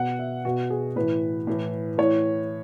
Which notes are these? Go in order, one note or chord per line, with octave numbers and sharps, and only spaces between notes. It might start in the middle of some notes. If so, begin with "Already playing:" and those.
Already playing: B2 F#5
E5
B2 F#4
G#4
A2 E3 B4
A2 E3
A2 E3 C#5